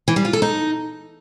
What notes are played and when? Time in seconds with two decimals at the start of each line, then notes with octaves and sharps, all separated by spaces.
0.08 E3
0.16 G3
0.25 F4
0.33 A4
0.42 D#4